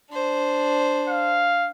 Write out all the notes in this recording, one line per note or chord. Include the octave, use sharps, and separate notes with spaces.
D4 C5
F5